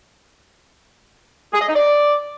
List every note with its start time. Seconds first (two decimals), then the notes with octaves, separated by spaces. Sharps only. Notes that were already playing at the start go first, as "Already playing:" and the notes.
1.54 G#4
1.61 D#5
1.68 D#4
1.75 D5